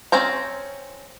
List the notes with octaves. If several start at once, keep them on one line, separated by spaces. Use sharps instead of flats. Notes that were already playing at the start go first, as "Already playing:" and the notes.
C4 C#4 C5 A#5